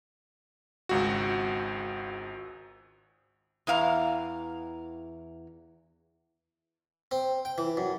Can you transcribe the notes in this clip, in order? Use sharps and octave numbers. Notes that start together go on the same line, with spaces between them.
G#1 C#2 F#4
E2 E3 F5 A#5
C4
G5
E3
F#2